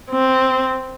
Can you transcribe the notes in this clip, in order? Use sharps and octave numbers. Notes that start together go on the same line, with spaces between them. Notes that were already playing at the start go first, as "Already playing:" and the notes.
C4